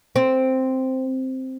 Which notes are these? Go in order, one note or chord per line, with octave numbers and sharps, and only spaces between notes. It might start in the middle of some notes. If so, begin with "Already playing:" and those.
C4